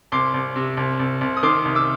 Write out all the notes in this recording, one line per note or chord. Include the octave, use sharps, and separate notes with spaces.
C2 C6 D6
C2
C3
C2
C2
C2
D#6
D#3 C6 D6
C2
D6 E6